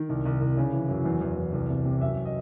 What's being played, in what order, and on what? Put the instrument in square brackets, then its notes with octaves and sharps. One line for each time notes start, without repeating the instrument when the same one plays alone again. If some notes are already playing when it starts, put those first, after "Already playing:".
Already playing: [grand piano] D#3
C2
C2
C2
C#3
E3
F#2
E2
E2
E2
C2
C3
C3
F#2 E5
D#5